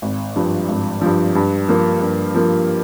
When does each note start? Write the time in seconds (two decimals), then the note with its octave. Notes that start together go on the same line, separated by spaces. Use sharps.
0.02 G#1
0.36 G2 F3
0.68 G#1
1.01 G2 F3
1.35 G2
1.68 F3 A#3
2.01 G2
2.35 F3 A#3